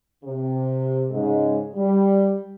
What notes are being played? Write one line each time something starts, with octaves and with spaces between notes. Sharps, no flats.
C3
G#2 C#3 G#3
G3